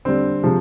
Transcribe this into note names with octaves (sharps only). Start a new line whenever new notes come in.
D3 G3 C4
C3 F3 G#3